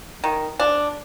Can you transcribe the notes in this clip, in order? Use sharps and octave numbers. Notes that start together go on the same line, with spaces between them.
D#3
D4